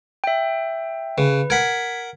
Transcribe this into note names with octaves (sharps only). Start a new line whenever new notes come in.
E5 G5
C#3 B4
A#4 F#5 G#6 B6